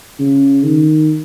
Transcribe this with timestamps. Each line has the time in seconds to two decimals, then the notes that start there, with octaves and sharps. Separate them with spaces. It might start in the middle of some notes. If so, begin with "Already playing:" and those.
0.19 C#3
0.64 D#3